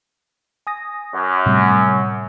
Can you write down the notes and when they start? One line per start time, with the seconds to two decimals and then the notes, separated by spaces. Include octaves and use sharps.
0.67 G#5 D#6 A#6
1.14 F#2
1.46 A2 C3 G3